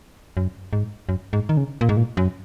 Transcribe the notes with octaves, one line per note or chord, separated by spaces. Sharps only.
F#2
G#2
F#2
G#2
D#3
C#3
A#2
G#2
A#2
F#2